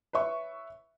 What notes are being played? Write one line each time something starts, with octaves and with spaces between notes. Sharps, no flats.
B4 C#5 E5 C#6